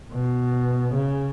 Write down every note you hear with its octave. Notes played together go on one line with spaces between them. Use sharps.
B2
C#3